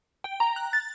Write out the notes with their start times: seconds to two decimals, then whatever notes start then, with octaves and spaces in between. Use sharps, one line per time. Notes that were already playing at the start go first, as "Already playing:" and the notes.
0.24 G5
0.40 A#5
0.56 F#6
0.73 A6